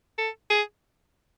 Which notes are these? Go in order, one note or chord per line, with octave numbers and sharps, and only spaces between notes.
A4
G#4